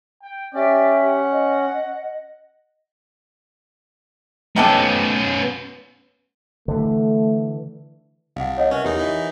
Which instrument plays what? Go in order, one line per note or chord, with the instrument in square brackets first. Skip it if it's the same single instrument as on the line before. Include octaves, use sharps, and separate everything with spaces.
[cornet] G5
[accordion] C#4 [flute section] G4 E5 G5 [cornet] D5
[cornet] F#5
[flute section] D#5
[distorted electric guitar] B3 C#4 [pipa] D#4 G4 A4
[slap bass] D3 E3 [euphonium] A3
[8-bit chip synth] C2 [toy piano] F5 F#5
[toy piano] C#5 D#5 F#5
[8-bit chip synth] C#4 [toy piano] A#4 B4 E5
[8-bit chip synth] E2 D#4 [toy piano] G4
[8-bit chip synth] E3 D#4